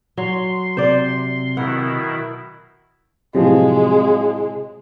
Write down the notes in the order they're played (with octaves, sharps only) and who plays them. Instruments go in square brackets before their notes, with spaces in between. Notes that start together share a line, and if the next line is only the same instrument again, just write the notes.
[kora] F#3 [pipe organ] C6
[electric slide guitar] C3 [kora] C5 D5
[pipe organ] B2 D#3 E4 [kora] F#5
[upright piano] A2 F3 F#3 [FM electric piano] C3 [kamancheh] G#3